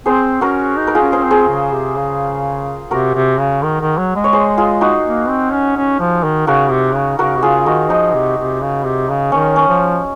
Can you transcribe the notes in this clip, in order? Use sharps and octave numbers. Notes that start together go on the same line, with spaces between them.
C4 G#4 C5
C#4 F#4 A#4
D#4
A#4
F4 G#4
C#4
C#4 G#4 C5
C4
G#4 C5
C#3
C3
C#3
C3 F#4 A#4
C3
C#3
D#3
D#3
F#3
G#3
C#5
G#4 C5
F4 G#4
D#4 F#4
A#3
C4
C#4
C#4
F3
D#3
C#3 F#4 A#4
C3
C#3
C#3 F#4 A#4
C3
C#3 F4 G#4
D#3 D#4 F#4
F3 D#4
C3
C3
C#3
C3
C#3
D#3 C#4
C#4
F3